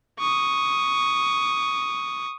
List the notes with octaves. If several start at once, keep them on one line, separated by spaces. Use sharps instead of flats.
C#6 D#6